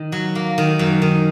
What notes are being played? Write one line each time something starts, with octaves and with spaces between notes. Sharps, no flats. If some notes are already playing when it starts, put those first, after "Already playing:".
Already playing: D#3
F#3
A#3
D#3
F#2
D#3